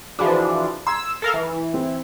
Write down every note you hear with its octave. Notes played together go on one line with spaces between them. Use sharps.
E3 F3 D4 F#4 G#4 B5
C6 E6 G#6
A4 A#4 F5
E3
C4